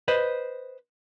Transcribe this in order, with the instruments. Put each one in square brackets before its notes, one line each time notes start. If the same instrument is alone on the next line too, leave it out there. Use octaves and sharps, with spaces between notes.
[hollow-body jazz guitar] B4 C5 D#5